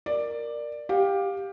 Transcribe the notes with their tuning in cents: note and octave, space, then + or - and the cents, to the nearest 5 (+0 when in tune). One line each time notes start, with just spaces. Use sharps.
A#4 +0 D5 +10
G4 +10 F5 +20